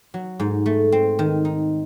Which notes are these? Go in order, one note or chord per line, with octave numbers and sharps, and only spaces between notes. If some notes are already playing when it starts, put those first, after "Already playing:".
F#3
G#2
A3
C4
D#3
D#4